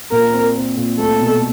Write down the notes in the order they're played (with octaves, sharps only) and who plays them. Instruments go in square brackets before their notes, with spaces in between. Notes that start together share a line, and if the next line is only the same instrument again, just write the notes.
[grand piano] A#2 [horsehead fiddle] A#4
[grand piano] C4
C4
A#2
[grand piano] A3 [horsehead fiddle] A4
[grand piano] B2